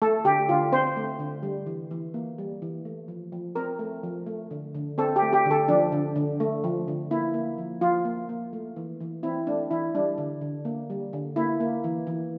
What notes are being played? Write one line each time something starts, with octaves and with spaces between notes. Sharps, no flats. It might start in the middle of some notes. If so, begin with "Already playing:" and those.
A3 A4
D3 G4
D3 F4
C4 C5
A3
D3
G3
E3
E3
A#3
G3
E3
A3
F3
F3
C4 A#4
A3
F3
A3
D3
D3
C4 A4
G4
A3
G4
D3 A4
F3 D4
D3
D3
A3
F3
D3
A#3 E4
A#3
F3
F3 F4
A#3
A#3
A3
E3
E3
C4 E4
A3 D4
E3 E4
G3 D4
D3
D3
A#3
G3
D3
A#3 E4
A#3
E3
E3